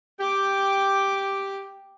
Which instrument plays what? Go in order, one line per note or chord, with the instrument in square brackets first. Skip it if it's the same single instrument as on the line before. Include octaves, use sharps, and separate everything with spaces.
[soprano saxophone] G4 [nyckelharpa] G5 D6